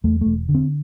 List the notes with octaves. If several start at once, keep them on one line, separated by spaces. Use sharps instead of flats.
E2 A3
E1 A3
D3
C4